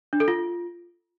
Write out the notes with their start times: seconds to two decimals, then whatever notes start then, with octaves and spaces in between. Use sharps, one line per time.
0.13 D4
0.20 A4
0.28 F4